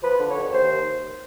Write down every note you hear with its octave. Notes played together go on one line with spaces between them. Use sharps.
F3 B4
D3
C#5
D#2
D#2 C5